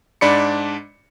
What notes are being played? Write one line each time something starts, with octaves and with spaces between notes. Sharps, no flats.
G#2 D4 D5 B5 D6 C#7